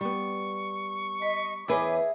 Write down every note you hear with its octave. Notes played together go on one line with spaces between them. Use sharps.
G3 B3 C#6
D#5 B5
E2 E4 G#4 B4 C#5 D#5 G#5 D6